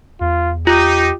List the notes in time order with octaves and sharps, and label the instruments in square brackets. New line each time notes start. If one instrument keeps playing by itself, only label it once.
[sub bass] E2 [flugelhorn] F4
[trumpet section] D#4 [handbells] F4 [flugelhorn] G4